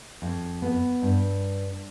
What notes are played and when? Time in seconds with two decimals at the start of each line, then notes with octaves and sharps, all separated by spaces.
0.22 F2
0.62 B3
1.02 G2